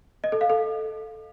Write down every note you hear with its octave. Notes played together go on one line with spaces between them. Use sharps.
D#5
A4
F5
A4